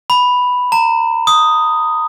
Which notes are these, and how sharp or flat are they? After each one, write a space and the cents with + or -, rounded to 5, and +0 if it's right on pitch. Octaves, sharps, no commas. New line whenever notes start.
B5 +0
A#5 -30
D#6 +0